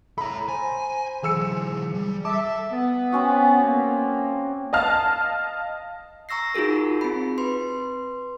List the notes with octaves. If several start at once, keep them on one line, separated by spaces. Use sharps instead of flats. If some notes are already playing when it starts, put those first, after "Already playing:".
A4 C#5 A#5 B5
C5 G#5
E3 F#3 G#4 E6 C#7
G3
A4 E5 A5 D6
B3
C4 C#4 F#4
A#3
D#5 F5 A5 F6
A#5 C#6 E6 A#6 C7
D#4 F4 F#4 G#4 A#4
C4 B5
B4 C6